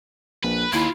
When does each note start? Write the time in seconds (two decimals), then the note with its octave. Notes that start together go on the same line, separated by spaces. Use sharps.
0.44 A#1 B4
0.73 D#2 E4 F4 B4